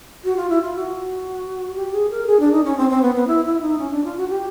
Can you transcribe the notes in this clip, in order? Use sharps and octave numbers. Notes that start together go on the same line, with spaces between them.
F#4
F4
E4
F4
F#4
G4
G#4
A#4
G#4
D4
D#4
C#4
C4
C4
B3
B3
E4
E4
D#4
C#4
D4
F4
F#4
G4